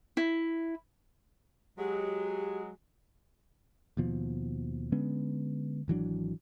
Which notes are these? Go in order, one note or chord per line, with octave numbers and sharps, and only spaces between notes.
E4
F#3 G#3 G4
D#2 B2 F3
D3 G#3 B3 C#4
G#1 E3 F#3 D4